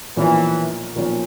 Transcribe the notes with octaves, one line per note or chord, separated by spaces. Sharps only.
B1 A#2 E3 F3 A#3 C#4
B1 A#2 F3 A#3 C#4